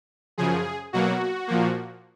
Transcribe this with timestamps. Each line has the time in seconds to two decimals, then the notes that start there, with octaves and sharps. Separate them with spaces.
0.38 F#2 C#3 F3 G#4
0.93 B2 F#3 A#3 F#4
1.47 A#2 F3 A#3